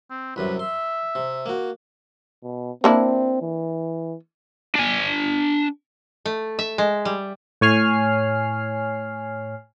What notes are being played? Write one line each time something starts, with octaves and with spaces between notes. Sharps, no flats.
C4
C2 F#2 C3 B4
E5 C6
C3
A#3 F#4
B2
A#3 C4 D4 E4
E3
D4 G#5
A3
E5
G#3
G3
A2 C#5 G#5 F6 C7